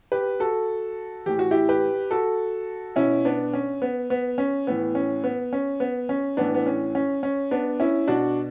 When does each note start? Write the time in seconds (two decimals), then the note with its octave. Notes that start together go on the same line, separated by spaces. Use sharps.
0.12 G4 B4
0.40 F#4 A4
1.26 A2 E3 G4
1.39 F#4
1.51 E4 G4
1.69 G4 B4
2.11 F#4 A4
2.96 B2 C#4 E4
3.25 B3 D4
3.53 C#4
3.82 B3
4.10 B3
4.38 C#4
4.67 A2 E3 B3
4.95 C#4
5.24 B3
5.53 C#4
5.80 B3
6.09 C#4
6.37 A2 E3 B3 D4
6.54 B3
6.66 C#4
6.95 C#4
7.23 C#4
7.51 B3 D4
7.80 C#4 E4
8.08 B2 D4 F#4